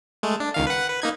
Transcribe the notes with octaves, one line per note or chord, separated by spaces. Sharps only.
G#3 A3
D4
C#2 D#3 F5
B4 F#5
B4
A#3 D#4 G#6